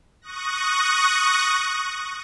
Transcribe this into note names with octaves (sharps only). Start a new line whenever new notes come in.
C#6 D#6 F#6 A#6